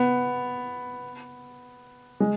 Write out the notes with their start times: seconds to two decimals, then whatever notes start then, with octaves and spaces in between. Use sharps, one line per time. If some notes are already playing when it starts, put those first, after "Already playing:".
Already playing: B3
2.20 G#3